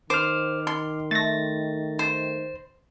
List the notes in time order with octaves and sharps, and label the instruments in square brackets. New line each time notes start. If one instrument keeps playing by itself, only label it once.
[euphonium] D#3 [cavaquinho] C5 [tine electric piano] D6 F6
[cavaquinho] C6
[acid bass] A3 [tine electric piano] A6 A#6
[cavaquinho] C5